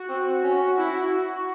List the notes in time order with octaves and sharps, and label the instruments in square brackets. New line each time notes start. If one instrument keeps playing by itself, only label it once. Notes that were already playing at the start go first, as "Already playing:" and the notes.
Already playing: [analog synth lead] F#4
[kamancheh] C4
C#4
E4